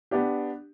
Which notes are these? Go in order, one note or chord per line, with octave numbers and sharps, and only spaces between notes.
B3 D4 G4